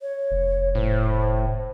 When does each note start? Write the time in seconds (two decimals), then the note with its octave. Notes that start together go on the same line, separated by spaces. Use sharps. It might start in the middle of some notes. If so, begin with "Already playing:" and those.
0.01 C#5
0.31 F1
0.75 A2 C5